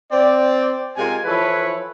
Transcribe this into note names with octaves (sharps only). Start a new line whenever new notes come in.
C4 D5
C3 G#3 F4 A#4 G#5
E3 F3 E4 A4 B4 C#5